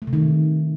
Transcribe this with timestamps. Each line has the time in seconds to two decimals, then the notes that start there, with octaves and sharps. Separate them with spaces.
0.02 A3
0.07 C3
0.13 D#3